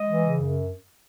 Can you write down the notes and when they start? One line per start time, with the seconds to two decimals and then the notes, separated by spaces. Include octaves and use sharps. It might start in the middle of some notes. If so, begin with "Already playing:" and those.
Already playing: G#3 D#5
0.09 E3
0.25 C#3
0.40 F#2